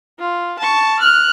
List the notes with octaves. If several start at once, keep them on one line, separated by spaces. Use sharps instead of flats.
F4
A5 C#6
F6 F#6